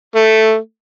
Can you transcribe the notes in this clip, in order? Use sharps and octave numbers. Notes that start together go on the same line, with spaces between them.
A3